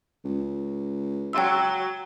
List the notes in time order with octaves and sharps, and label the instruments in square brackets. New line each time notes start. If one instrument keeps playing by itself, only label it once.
[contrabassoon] C#2
[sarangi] F#3 [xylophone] G5 E6